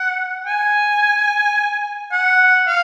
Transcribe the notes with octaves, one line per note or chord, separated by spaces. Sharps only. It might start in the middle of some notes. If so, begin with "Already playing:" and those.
Already playing: F#5
G#5
F#5
F5